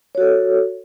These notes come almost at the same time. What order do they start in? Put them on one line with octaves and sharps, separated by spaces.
C#5 F#4 A4